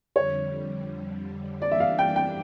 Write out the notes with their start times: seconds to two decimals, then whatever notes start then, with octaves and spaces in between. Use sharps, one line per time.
0.16 F2 D3 G3 C#5
1.62 E3 G3 A#3 D4 D5
1.71 E5
1.80 F5
1.99 G5
2.16 G5